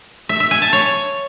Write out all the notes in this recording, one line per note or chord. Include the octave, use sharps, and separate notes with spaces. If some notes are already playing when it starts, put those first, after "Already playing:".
E5
E5
G#5
A5
C#5